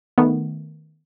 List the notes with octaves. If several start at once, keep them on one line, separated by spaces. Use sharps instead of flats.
D#3 A3 B3